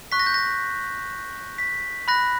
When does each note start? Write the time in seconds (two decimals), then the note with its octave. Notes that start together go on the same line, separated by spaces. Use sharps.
0.12 C#6 F#6 B6
0.19 A#6
0.27 G6
0.34 A#6
1.58 B6
2.08 B5 F#6 A#6